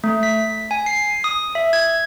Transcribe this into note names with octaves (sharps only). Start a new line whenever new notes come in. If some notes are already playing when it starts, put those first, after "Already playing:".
A3
B6
G#5
C7
D#6
E5
G#6